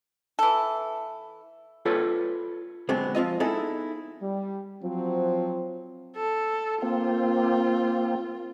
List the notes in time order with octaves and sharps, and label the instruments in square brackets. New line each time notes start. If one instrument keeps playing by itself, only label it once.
[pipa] E3 A4
[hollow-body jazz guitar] F4 A4 B4 C#5 D5
B2 D3 F#3 G#3 B3 C4
F3 C4 F4 D#5
B3 D#4 E4 G#4 A4
[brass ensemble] G3
[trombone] F3 [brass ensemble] F#3 C4
[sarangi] A4
[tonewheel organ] A#3 C4 [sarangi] F4